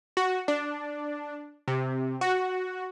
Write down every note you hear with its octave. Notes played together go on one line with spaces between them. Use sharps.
F#4
D4
C3
F#4